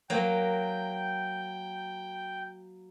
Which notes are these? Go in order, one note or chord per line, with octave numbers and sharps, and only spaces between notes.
F#3 A#3 G5